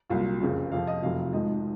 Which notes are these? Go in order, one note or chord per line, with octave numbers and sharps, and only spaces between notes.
C2 A#2 F#3 F4
F#1 F2 C#3
F2 C3 F3 F5
D#5
F1 F2 C3 F#3 F5
G#1 G#2 F3 D#5